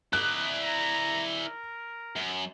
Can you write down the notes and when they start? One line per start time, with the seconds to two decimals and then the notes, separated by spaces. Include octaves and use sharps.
0.13 D#4 E4 D5 F#6
0.63 A#5
1.41 A#4
2.16 F#2